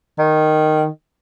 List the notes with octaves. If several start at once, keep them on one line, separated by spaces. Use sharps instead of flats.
D#3